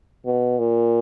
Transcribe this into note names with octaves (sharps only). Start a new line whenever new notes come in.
B2
A#2